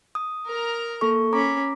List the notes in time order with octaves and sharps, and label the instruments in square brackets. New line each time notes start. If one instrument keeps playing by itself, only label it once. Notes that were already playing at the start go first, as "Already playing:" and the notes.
[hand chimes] D#6
[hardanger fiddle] A#4 A#5
[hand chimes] A#3 A4 C#6
[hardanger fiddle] C#4 B5 [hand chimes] A#5 D6